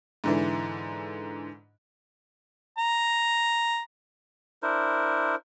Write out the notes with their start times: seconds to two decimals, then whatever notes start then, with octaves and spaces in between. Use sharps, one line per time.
0.24 G#2 D3 E3
2.78 A#5
4.63 D4 E4 A#4 C5